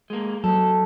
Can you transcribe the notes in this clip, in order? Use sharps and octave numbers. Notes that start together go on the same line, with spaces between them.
G#3 A#3
F#3 A4